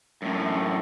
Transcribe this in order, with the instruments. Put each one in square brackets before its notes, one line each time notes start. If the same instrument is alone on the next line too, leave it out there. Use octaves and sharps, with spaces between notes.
[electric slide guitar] F#2 A2